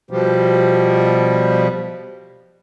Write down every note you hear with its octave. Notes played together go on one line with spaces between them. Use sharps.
B2 F3 G3